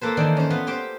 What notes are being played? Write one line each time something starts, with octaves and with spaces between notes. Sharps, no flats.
A#3 A4 B4 C5
D#3 E3 D4 E5 G5
C#4 C5
B3 F4 B4
G4 C5 G5